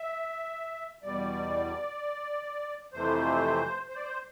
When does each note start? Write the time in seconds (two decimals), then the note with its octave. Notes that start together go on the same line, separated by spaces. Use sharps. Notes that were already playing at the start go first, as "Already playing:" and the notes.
Already playing: E5
1.03 E2 B2 G3 D5
2.93 F2 C3 E3 A3 C5
3.88 C5
3.95 D5
4.02 C5